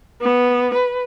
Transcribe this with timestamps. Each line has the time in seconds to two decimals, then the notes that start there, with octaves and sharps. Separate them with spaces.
0.22 B3
0.74 B4